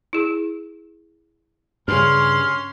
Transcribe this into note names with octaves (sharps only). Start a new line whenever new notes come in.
E4 G#4
G2 C#3 C#4 C6 F6